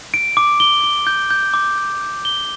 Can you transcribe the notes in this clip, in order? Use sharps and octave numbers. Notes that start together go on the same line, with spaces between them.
D7
D6
G7
G7
G6
G6
D6
G6
G6
G7